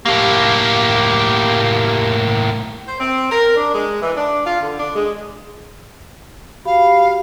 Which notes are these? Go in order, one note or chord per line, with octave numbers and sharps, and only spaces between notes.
A2 A#3 G4
C5
C4
A#4
D4
G#3
E3
D4
F4
D3
D4
G#3
F#4 G4 F5 B5